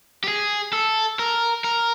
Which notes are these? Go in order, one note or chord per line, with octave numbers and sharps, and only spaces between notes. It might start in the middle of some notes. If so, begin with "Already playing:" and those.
G4
G#4
A4
A#4
A#4